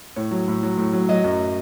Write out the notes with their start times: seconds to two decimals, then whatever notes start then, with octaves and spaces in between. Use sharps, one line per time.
0.16 A2 C#5
0.31 F#3
0.48 A2
0.63 F#3
0.78 A2
0.93 F#3
1.09 F#3 D#5
1.24 F#2